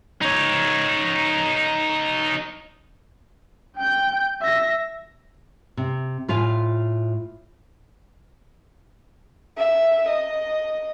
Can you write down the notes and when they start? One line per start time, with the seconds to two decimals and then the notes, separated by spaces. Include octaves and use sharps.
0.21 D#4 C#5
3.77 G5 G6
4.42 E5 A#6
5.77 C3
6.28 A2 F4 F5 G#5
9.58 E5
10.09 D#5